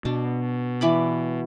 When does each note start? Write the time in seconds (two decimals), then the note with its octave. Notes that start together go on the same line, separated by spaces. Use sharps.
0.05 B2 D4
0.81 E3 D5 B5